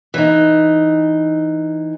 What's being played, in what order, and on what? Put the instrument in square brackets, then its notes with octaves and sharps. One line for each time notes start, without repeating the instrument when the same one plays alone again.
[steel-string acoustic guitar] E3 D#4